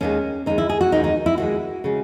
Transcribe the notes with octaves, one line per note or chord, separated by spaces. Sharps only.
D#2 D#3 G#3 C#4
D#2 D#3 G#3 D#4
E4
G#4
F#4
D#2 D#3 G#3 D#4
D#4
E4
D#2 D#3 G#3 F#4
C#3 G#3